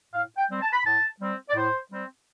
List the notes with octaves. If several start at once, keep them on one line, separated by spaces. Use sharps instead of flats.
A2 F5
G5
G3 C4
A5
B5
A2 A5
G3 C4
D5
A2 C5
G3 C4